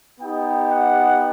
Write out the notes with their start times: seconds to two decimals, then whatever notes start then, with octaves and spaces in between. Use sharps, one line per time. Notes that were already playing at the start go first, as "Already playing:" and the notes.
0.20 B3 D#4 G4 G5
0.68 F#5